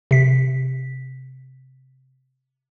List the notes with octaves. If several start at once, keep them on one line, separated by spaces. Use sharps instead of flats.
C3 B6